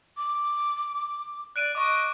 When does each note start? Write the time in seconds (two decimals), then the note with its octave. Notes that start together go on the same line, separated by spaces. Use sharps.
0.17 D6
1.56 D5 F#6 D7 D#7
1.75 D#5 C#6 D6